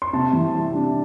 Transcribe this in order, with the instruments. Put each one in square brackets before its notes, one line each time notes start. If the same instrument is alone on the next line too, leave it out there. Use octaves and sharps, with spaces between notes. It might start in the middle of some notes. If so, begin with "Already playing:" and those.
[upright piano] C6
C3 A5
E3
G3
D4